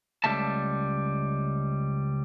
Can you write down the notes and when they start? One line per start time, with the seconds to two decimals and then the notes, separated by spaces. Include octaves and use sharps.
0.24 C#2 F#3 G3 A3 E5 A5